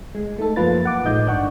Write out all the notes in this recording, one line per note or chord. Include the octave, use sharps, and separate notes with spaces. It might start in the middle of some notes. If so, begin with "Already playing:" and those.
G#3
A3 D#4 A4
F#2 F3 A#3 F4 B4 A6
F#5 D6
A1 A2 G#3 D#4 D#5 G6
G1 D4 F#5 C#6